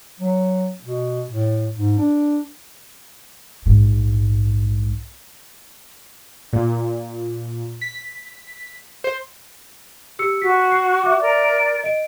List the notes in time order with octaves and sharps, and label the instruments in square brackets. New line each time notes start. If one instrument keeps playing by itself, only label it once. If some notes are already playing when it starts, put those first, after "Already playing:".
[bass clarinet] F#3
B2
A2
G#2
D4
[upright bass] A#1 G#2
[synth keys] A#2
B6
C5
[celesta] G4 E6 C#7
[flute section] F#4 [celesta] B6
[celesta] C7
E5 D6
[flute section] A#4 D5
[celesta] D#5 D7